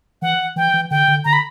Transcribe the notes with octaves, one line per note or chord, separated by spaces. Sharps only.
E3 F#5
E3 G5
E3
D3 G5
D3
D3 A#5
B5